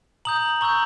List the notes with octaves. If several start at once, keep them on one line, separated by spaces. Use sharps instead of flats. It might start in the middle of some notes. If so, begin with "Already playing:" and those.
A#5 D#6 G6 F#7
A#5 C#6 E6 G6 F#7